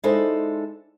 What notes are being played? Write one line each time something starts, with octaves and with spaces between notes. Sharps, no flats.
G#3 D#4 E4 A4 C5 D5